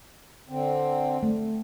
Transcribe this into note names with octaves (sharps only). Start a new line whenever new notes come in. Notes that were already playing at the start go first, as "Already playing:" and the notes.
D3 C4
A3